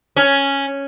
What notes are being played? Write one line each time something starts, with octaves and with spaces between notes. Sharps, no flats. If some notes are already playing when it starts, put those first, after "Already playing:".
C#4